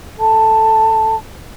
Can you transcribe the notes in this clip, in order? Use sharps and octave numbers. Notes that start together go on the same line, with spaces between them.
A4 A5